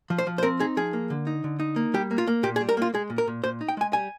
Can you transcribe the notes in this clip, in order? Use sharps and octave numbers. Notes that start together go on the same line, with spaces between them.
F3
C5
F3
C5
C4 A#4
D#4 G#4
F3 G#4
A#3
D3
D#4
D3
D#4
A#3
G3 G4
A#3
F4
A#3
A#2 G4
G#4
G3
A#4
A#3 F4
G#3 G#4
A#2
A#4
A#2
A#2 C5
D#4
G5
G#3 G#5
G3 G#5